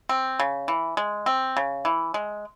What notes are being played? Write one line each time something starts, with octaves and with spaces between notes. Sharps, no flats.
C4
C#3
E3
G#3
C4
C#3
E3
G#3